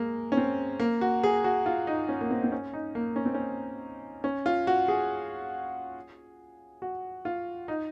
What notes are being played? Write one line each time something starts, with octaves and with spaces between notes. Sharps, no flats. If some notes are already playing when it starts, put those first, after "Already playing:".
Already playing: G#3 A#3
C#4
C4
A#3
F#4
G#4
F#4
F4
D#4
C#4
A#3
C4
C4
C#4
D#4
A#3
C#4
C4
C#4
C#4
F4
F#4
G#4
F#4
F4
D#4